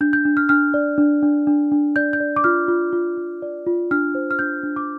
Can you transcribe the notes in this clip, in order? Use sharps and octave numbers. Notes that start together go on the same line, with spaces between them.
D4 G6
G6
D4
F6
D4 F6
D5
D4
D4
D4
D4
D5 G6
G6
D5
D6
F4 F6
F4
F4
F4
D5
F4
D4 F6
C5
F6
D4 G6
D4
D6